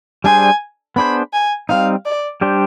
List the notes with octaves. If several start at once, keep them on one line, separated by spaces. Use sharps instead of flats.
G3 D4 G#4 C5 G#5
B3 D4 G#4 C5 B5
G#5
G3 C4 D#4 F5
D5
G3 D4 G4 C5